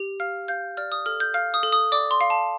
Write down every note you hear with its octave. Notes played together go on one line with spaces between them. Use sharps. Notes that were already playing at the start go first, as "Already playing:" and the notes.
Already playing: G4
F5 F6
F5 G6
D5 F6
D#6
A4 F6
G6
F5 F6
D#6
A4
D#6
D5 D6
C6
F5
A5